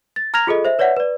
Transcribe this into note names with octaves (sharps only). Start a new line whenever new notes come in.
A6
A#5 F6 G#6 A#6 F7
F4 G#4 A4 D#5
C5 E5
B4 C#5 D5 E5 F#5
B4 D5